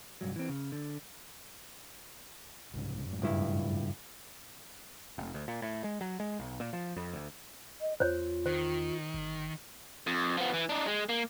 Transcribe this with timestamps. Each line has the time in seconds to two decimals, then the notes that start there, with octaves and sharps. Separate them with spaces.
0.21 C2 G2 F#3
0.36 E3 C4
0.49 C#3
0.72 D3
2.74 C2 G#2 C#3
3.06 F#2 A2
3.22 C#2 G2 E4
5.18 F1
5.34 D2
5.48 A#2
5.62 A2
5.84 G#3
6.01 F#3
6.20 G#3
6.39 B1
6.60 A#2
6.73 F3
6.96 F2
7.13 D2
7.81 D#5
8.00 E2 F4 C5 C#5
8.46 D#3 C5
9.14 G1
10.07 F2
10.37 F3 B3
10.53 E3
10.69 D4 D#4
10.86 G#3
11.09 A#3